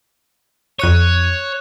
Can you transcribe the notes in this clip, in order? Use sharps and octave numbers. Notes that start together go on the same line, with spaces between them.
F2 C#5 C#6 F#6 D#7